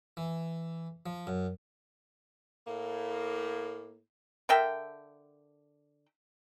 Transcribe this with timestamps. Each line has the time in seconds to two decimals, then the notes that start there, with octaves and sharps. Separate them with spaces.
0.17 E3
1.06 F3
1.27 F#2
2.68 A2 A#3
4.49 D3 A#4 E5 G5